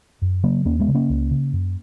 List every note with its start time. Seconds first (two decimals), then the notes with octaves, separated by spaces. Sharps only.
0.22 F#2
0.43 C#3 F#3 A#3
0.65 D#2 A#3 C#4
0.79 G#3 B3
0.88 C#3
0.95 A#3 C#4
1.10 C#2
1.31 C#3
1.53 F#2